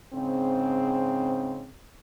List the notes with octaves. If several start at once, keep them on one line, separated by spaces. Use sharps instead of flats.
G#2 C#3 C4